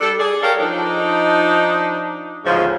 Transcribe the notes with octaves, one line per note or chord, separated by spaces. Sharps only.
G3 D4 A4
G#4 D5
G4 A4 A#4 C#5 F5
F3 D4 D#4
D2 G#2 C#3 F3